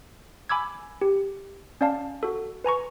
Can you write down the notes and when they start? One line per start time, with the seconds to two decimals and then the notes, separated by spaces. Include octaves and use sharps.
0.49 G#5 B5 D6 E6 G#6
1.01 G4
1.81 C#4 D5 F5 A5
2.23 F#4 A4
2.64 B4 G#5 A#5 C#6